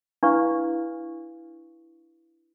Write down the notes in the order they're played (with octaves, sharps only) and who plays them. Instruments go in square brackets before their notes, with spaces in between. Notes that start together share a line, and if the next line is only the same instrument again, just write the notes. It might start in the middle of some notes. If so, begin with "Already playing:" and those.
[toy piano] D4 E4 B4 F5 C#6